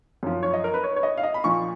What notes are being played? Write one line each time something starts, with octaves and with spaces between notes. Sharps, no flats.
F#2 F3
C#5
D#5
A#4
B4
C#5
C#5
D#5
F5
D#5
B5
A#2 F3 C#6